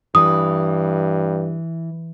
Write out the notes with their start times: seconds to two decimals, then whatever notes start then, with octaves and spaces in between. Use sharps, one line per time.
0.15 G2 E3 D#6